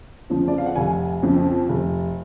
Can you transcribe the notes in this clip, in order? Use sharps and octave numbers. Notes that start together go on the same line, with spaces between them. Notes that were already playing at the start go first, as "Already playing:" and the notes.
F2 C#3 F3
D5
F5
F#5
F1 G#5
F2 C#3 F3
F1